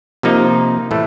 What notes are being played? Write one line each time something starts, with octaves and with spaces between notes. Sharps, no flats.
C3 F3 A#3 D#4
A2 E3 A3